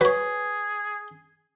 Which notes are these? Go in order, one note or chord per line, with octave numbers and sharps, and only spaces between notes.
F#3 G#4 B4 C#5